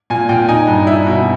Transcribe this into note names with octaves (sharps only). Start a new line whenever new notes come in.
A#2 G#5
A#2 G5
D#4 G#5
G2
E4
B2